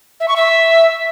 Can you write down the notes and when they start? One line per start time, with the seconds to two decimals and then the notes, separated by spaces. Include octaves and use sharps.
0.20 E5
0.28 C#6
0.36 E5